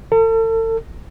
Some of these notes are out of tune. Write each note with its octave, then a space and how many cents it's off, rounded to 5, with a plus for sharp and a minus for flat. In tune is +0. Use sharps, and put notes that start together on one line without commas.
A4 +40